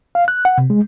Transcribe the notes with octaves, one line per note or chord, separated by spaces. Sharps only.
F5
F#6
F#5
C3
G#3